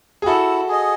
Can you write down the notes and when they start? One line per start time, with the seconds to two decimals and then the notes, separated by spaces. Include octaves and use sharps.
0.22 G#4
0.26 E4 F#4 A4
0.69 G#4 D#5